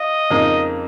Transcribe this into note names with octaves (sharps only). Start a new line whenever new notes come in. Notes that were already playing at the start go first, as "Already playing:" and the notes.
Already playing: F4 D#5
F2 C#3 A#3 D#4 A#4